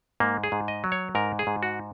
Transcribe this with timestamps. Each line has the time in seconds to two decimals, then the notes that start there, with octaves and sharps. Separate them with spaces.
0.20 G#2 A#3
0.44 G#4
0.52 G#2
0.68 D#5
0.84 F#3
0.92 C#5
1.15 G#2 A#4
1.39 G#4
1.47 G#2
1.63 F#4